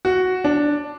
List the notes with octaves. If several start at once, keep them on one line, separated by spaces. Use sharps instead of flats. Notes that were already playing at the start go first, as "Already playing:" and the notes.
F#4
D4